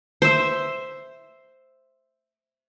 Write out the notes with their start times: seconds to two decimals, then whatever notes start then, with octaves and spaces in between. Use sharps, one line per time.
0.22 C5 E5